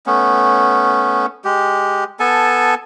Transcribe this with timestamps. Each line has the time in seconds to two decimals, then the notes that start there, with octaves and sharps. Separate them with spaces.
0.06 A3 B3 C#4
1.45 G#3 G4
2.20 B3 A4 G#5 A5